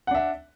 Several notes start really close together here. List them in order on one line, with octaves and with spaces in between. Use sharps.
F#5 D4 E5